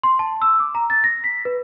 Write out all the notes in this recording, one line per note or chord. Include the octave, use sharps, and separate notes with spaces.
C6
A5
E6
D6
A#5
A6
A#6
B6
B4